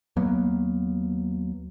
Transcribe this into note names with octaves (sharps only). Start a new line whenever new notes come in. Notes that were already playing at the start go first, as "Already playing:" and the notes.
D#2 F#3 A#3 B3